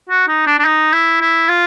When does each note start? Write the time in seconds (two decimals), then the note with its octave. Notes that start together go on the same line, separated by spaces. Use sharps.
0.09 F#4
0.28 D#4
0.47 D4
0.59 D4
0.65 D#4
0.93 E4
1.21 E4
1.49 F4